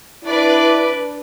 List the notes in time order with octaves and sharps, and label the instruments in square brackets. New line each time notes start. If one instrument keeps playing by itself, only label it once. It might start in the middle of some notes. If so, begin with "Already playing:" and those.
[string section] D4 B4 D5 [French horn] E4